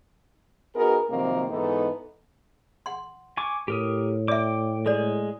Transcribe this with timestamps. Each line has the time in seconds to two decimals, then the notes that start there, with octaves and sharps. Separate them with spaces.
0.76 B3 D#4 F#4 G#4 A#4
1.10 C3 D#3 F3 F#3 A#3 C4
1.50 G#2 E3 B3 D#4 A4
2.86 F#5 C6
3.37 G#5 C#6 D6
3.68 A2 G4 A#4 D#6
4.28 D5 E5 G5 D6
4.86 G#3 G#4 A4 D5